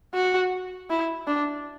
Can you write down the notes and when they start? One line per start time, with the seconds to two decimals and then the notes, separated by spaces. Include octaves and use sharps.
0.14 F#4
0.90 E4
1.27 D4